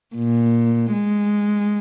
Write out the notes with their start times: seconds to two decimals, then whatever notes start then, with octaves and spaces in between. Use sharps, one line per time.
0.15 A#2
0.92 G#3